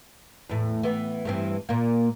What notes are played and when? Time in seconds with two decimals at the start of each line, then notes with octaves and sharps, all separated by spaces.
0.49 E2 A2
0.83 E3 B3
1.25 G2 E3 C4
1.69 A#2 A#3